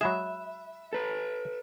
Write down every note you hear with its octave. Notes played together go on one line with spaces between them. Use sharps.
F#3 G#3 G#4 E5 B5 F#6 E7
A4 B4